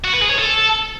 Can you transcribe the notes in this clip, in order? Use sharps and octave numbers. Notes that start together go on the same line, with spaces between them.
F#4
B4
G#4
C#5
A4